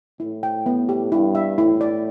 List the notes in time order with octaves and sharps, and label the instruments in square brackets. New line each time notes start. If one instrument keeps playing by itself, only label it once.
[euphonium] A2 [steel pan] E4
[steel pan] G5
B3
G4
[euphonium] G2 [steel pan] E4
[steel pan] E5
[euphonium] A2 [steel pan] E4
[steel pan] D5